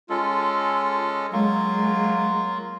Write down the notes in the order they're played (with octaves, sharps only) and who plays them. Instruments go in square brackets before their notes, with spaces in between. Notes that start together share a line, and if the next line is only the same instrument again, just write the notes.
[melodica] G#3 C#4 A4 [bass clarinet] F4
[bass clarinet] F#3 [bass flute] G#3 [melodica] A#3 F4